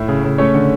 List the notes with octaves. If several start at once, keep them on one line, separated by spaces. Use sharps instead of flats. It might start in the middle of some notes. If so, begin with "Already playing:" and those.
Already playing: A2 E4 E5
C#3
C#3
A3 C#4 C#5
D3